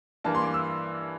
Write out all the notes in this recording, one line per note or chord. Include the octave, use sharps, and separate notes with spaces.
G2 E3 A#3 A5
C6
D6
E6